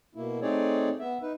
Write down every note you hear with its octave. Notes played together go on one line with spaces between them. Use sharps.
B2 A#3 E4
A3 C4 D#4 G#4 C#5 D5
B3 E5
D#4 B4